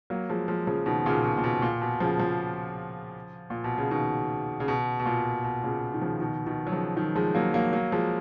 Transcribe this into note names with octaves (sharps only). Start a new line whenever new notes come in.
F#3 A#3
F3 G#3
F3 G#3
C#3 F3
B2 D#3
A#2 C#3
B2
A#2
B2
A#2
B2
C#3 F3
C#3 F3
A#2
B2
C#3
B2 D#3
C#3
B2
B2
A#2
B2
A#2 C#3
D#3
C#3 F3
B2 D#3
B2 D#3
F#3
C#3 F3
D#3 F#3
F3 G#3
F#3 A#3
F#3 A#3
F#3 A#3
F3 G#3